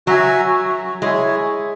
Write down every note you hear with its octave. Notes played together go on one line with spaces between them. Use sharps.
F#3 F#4 E5 G#5
G#3 E4 C#5 E5 G#5